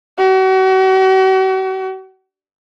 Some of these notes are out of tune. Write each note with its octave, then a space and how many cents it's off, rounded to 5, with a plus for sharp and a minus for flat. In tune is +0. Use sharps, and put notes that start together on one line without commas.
F#4 +40